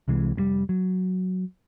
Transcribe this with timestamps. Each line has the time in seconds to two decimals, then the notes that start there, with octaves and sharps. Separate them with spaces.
0.08 C2 C3 E3 G#3
0.36 F1 C3 G3
0.69 F#3